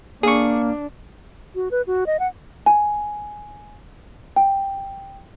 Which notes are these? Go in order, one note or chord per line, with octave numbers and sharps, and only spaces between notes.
A#3 D4 G#4 C#6
F#4
B4
F#4
D#5
F#5
G#5
G5